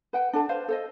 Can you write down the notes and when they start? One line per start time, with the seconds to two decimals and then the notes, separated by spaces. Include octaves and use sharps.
0.13 B4 F#5 G5
0.33 D4 A4 A5
0.49 B4 C5 F5
0.68 A4 C5 D#5